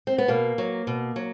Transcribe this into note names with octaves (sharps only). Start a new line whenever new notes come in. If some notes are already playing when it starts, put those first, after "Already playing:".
C4
B3
B2 A#3
F#3
B2
F#3